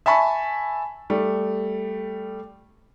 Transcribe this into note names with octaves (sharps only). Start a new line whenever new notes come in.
E5 G#5 A5 B5 C#6
G3 A3